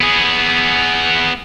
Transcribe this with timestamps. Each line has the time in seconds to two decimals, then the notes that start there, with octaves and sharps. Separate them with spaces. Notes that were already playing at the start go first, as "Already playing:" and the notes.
0.01 B3 G#4